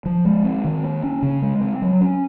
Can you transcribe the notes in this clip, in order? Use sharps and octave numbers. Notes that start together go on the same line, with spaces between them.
F3
G#3
C4
D#3
A#3
C#4
C#3
G#3
C4
F#3
C#4